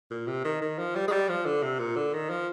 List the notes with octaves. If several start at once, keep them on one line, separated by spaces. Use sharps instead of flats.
A#2
C3
D#3
D#3
F3
G3
G#3
G3
F3
D3
C3
A#2
D3
D#3
F3